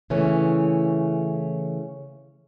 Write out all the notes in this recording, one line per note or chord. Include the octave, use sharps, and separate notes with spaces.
C#3 E3 A3 C#4